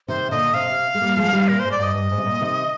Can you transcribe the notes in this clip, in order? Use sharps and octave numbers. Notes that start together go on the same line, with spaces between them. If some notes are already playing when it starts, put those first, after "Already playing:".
C3 D#3 C5
A#2 D3 D#5
C3 F5
C3
G#3
G3 A#3
F3 G#3
D#3 G3
A#2 A#4
G#2 C5
D5
G2 D#5
G2
G#2
C3
A#2
C3 D#3